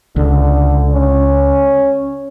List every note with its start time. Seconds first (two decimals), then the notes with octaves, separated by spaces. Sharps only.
0.16 C#2 D3
0.93 C#4